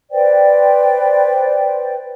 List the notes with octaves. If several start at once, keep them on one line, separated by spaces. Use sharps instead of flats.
B4 C5 D5 G5